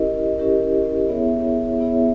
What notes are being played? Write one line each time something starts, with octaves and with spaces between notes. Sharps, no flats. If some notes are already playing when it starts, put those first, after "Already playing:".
Already playing: C#4 E4 G4 A#4 D#5
C#4 E4 G4 A#4 D#5
B3 E4 G#4 C#5 E5
B3 E4 G#4 C#5 E5